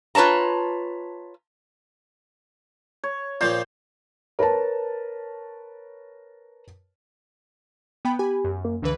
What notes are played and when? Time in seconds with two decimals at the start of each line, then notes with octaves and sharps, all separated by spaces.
0.15 F4 B4 C#5 A5 A#5
3.03 C#5
3.41 A#2 F3 C5 G5
4.39 A#4 B4 C#5 A5
8.05 B3 G5 B5
8.19 G4 G#5 B5
8.44 F#2
8.65 A#3
8.82 C#2 D3 E3 B4